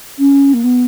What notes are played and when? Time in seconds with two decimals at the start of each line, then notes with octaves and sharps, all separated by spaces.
0.18 C#4
0.53 A#3
0.63 B3